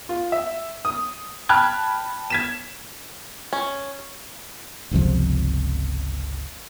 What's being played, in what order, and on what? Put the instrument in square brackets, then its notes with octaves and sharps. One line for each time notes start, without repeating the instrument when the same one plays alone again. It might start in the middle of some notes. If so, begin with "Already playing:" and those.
[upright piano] F4
E5
D#6
G5 A5 B5 F6 F#6 G#6
G#6 B6 E7
[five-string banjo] C#4
[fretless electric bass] G1 C#2 C3 F3